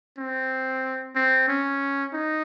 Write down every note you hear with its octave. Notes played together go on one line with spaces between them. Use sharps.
C4
C4
C#4
D#4